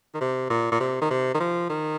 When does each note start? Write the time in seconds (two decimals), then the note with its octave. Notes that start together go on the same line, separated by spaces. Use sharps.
0.14 D#3
0.21 C3
0.50 A#2
0.72 A#2
0.80 C3
1.02 D#3
1.11 C3
1.35 D#3
1.40 F3
1.69 D#3